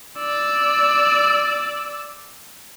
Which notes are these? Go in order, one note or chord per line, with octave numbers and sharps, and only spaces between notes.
D5 E6